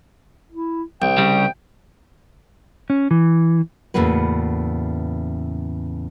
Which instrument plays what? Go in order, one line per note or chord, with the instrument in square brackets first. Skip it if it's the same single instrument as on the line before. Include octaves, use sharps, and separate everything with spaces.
[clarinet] E4
[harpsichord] C2 [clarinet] G5
[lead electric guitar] C#3 G3
[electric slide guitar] C#4
E3
[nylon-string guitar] E2 A2 C#3 A#3 F#4 B4